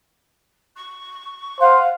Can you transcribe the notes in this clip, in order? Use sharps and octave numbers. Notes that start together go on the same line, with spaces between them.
C#6
C5 F5 F#5